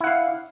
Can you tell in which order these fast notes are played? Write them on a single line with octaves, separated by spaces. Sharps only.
E4 F#5 F5